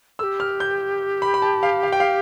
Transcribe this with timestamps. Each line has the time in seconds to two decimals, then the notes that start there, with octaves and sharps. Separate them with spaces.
0.19 A4 E6
0.23 G4
0.40 F6
0.60 G6
1.22 B5
1.34 B5
1.42 A5
1.63 F5
1.83 F5
1.92 G5
2.00 F5